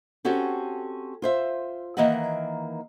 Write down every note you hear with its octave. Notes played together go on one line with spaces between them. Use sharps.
C4 C#4 F#4 G4 A4
F4 C5 E5
D#3 E3 A#3 D#5 E5 F#5